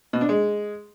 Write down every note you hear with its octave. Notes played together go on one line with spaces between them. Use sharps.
B2
D4
G#3